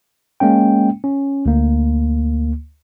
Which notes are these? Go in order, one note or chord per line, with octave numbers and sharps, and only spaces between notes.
G#3 A#3 C#4 G5
C#4
D2 A#3